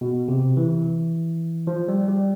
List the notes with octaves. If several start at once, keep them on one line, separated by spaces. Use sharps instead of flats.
B2
C3
E3
F3
G3
G3